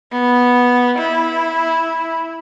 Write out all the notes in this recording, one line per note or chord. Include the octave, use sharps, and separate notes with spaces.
B3
E4